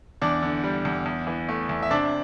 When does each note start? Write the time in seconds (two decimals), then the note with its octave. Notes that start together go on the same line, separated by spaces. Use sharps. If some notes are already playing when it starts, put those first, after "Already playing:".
0.21 E2 D4 D5
0.43 D3
0.64 G3
0.85 E2
1.06 E2
1.27 E3
1.49 A3
1.69 E2
1.83 E5
1.91 C3 D4 D5